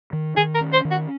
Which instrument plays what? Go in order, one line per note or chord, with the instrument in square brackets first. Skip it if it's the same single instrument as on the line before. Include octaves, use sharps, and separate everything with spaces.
[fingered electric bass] D#3
[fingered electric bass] D#3 [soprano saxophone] G#4
[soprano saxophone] A#4
[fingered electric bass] C#4
[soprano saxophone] C5
[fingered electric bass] D#3
[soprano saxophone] F#4